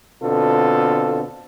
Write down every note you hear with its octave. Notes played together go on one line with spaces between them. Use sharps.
B2 D3 C4 F4 A4